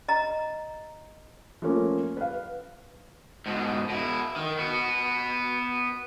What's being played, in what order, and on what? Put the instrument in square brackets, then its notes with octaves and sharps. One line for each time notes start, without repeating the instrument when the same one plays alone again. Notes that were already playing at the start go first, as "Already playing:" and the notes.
[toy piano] D#5 A#5
[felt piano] F3 A3 A#3 C#4
B4 F5
[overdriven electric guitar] G#2 B2
B2 E4
D#3
B3 F#4